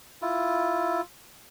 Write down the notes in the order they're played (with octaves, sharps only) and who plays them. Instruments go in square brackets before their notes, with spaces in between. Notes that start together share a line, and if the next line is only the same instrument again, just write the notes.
[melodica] E4 F4